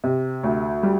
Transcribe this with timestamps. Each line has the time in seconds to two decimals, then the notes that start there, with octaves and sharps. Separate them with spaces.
0.04 C3
0.44 D2
0.83 G3